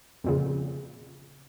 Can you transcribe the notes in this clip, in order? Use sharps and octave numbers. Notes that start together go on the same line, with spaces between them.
F2 A#2 C#3